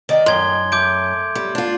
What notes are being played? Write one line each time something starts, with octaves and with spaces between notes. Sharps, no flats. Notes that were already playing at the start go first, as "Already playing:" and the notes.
D#3 D#4 D5 G5
F#2 C6 G#6 G7
A3 D6 G6 D7
G3
D4 F4